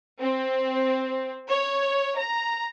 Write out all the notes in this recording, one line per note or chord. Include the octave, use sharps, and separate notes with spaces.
C4
C#5
A#5